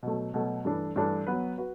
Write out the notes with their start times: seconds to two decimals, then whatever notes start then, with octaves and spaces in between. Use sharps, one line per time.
0.03 B2 F#3 A3
0.34 B2 F#3 A3
0.65 G2 E3 A3 D4 A4
0.96 G2 E3 A3 D4 A4
1.27 F#3 B3 F#4 B4
1.58 F#4 B4